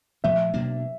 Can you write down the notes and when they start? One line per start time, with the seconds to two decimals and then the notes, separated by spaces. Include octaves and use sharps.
0.24 A#2 F3 A3 E5
0.53 B2 F#3 A#3 D4